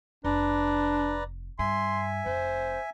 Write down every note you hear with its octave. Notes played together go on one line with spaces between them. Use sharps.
F1 D4 B4 D5 A#5
G2 E5 G#5 C6
F1 C5